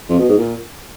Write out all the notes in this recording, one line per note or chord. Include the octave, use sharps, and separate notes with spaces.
F2
B2
G#2
A#2